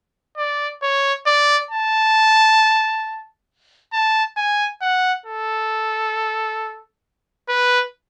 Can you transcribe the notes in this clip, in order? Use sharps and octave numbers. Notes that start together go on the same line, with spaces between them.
D5
C#5
D5
A5
A5
G#5
F#5
A4
B4